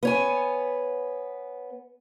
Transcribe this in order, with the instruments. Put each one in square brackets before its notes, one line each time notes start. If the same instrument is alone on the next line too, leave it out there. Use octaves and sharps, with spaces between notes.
[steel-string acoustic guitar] B3 C#5 G#5